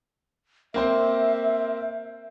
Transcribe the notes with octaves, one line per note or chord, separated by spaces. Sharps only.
A#3 C4 C5 E5